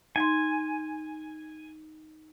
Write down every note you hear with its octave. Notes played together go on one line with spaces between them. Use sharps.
D#4 G#5 C6